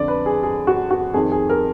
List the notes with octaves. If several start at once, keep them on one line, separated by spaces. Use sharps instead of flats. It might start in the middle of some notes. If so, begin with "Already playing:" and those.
Already playing: F2 D3 D5
B4
G#4
G#4
F#4
F#4
F2 D#3 G#4
G#4
A#4